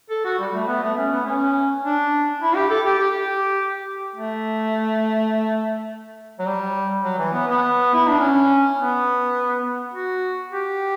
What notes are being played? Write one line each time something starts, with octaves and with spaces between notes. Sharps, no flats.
A4
F#4
G3
A3
B3
A3
C#4
B3
C#4
D4
E4
G4
A4
G4
G4
A3
F#3
G3
F#3
E3
B3
B3
E4
D4
C#4
B3
F#4
G4